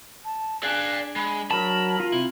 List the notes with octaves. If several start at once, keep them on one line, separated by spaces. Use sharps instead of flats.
A5
D4 G#4 D5 F5 F#6
G#3 B5
F#3 A#4 A5 B5
F4
C3 E4